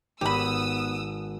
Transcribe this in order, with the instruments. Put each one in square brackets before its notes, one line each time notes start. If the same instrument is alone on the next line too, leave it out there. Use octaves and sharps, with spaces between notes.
[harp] G#1 D#7 [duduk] B3 [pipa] G4 B5 [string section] D#6 E6